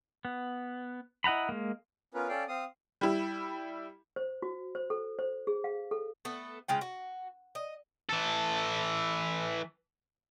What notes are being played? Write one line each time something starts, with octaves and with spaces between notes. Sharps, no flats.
B3
E4 D#5 F#5 A#5 B5
G#3 A#3
B3 C#4 F4 A#4 B4
C#4 A4 D5 F5 G5
C4 F5 D#6
G3 E4
C5
F#4
C5
A4
C5
G#4
F5
A4
A3 B3 A4
C#3 G#3 F4 G5
F#4
D#5
E3 A4